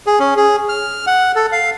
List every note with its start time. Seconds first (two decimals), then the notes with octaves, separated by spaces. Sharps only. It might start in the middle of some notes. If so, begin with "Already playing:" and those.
0.06 G#4
0.19 C#4
0.37 G#4
0.69 F6
1.07 F#5
1.36 A4
1.52 F5